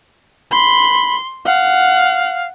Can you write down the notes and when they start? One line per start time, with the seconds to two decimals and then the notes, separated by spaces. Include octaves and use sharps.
0.51 B5 C6
1.45 F5 F#5